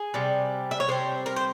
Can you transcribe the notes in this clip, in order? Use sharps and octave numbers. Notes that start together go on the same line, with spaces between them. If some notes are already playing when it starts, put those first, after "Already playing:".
Already playing: G#4
C3 G3
E5
C#5
C3 G3 C5
A#4
C5